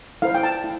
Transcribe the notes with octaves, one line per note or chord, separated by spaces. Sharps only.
E4 A4 C5 F5
G5
A5
E4